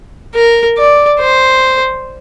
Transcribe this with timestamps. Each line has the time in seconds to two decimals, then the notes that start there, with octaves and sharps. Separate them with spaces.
0.34 A#4
0.78 D5
1.19 C5